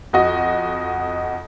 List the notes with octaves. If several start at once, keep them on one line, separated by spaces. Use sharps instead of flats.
F2 F#4 D#5